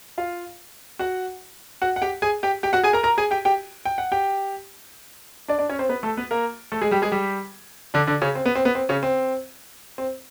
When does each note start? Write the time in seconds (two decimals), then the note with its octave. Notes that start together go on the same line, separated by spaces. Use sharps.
0.18 F4 F5
0.99 F#4 F#5
1.82 F#4 F#5
1.96 F#5
2.02 G4 G5
2.22 G#4 G#5
2.43 G4 G5
2.63 G4 G5
2.73 F#4 F#5
2.84 G#4 G#5
2.93 A#4 A#5
3.03 A#4 A#5
3.18 G#4 G#5
3.31 G4 G5
3.45 G4 G5
3.85 G5
3.98 F#5
4.12 G4 G5
5.48 D4 D5
5.59 D4 D5
5.69 C#4 C#5
5.79 C4 C5
5.89 B3 B4
6.03 A3 A4
6.17 B3 B4
6.31 A#3 A#4
6.72 A3 A4
6.81 G#3 G#4
6.91 G3 G4
7.02 G#3 G#4
7.12 G3 G4
7.94 D3 D4
8.07 D3 D4
8.22 C#3 C#4
8.35 C4
8.46 B3
8.55 C4
8.65 B3
8.75 C4
8.89 C#3 C#4
9.03 C4
9.98 C4